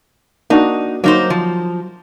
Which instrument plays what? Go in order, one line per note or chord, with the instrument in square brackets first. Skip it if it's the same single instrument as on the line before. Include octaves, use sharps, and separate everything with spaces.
[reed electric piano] A#3 D4 F#4 [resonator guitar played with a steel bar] D#4
[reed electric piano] F#3 [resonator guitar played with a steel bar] A#3 D#4 C5
[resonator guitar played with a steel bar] F3